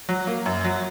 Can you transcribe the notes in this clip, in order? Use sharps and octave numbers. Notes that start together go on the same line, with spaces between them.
F#3
A#3
F#2
F#3